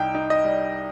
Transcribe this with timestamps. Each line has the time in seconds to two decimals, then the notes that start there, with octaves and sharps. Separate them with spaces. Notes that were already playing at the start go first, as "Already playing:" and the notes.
Already playing: C2 D#4 G5
0.15 D#4
0.30 D#5
0.44 G3